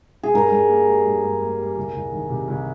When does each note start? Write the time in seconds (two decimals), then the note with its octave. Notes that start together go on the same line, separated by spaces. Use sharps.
0.23 G#4
0.34 G2 A#4
0.52 G2
0.69 A#3
0.88 G3
1.05 G2
1.24 G2
1.42 A#3
1.59 G3
1.77 C2
1.95 C2
2.12 D#3
2.30 C3
2.48 C2